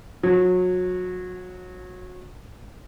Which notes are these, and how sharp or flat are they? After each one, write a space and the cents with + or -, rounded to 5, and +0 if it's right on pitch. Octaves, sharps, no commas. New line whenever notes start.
F#3 -25